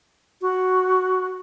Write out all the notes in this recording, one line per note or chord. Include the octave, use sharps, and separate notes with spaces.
F#4